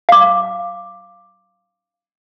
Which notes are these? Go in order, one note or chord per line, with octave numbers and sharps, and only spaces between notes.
F5 D6